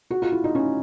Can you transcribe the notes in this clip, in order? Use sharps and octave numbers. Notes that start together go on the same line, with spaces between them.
F#4
F4
E4
D#4
C#4